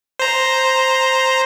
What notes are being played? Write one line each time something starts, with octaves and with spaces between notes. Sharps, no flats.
C5 A#5